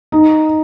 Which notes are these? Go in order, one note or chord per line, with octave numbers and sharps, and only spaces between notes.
D#4